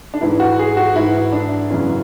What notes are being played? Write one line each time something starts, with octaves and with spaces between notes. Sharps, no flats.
D4
G#2 E3 E4
F#4
G#4
F#4
G#2 E3 E4
D4
F#2 C#3 E3 C#4